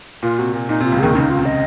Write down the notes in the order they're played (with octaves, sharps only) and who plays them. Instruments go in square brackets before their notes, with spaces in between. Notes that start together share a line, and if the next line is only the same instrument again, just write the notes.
[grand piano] A#2 [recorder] F4
[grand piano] C3 [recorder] F#4
[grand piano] A#2
[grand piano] A#2 [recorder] D#4
[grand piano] C3
[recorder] F4
[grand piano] C#2 C#3
[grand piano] D#2 D#3 [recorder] G#4
[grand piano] C#2 C#3 [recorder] D#4
[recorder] F4
[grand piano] C3
[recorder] D#5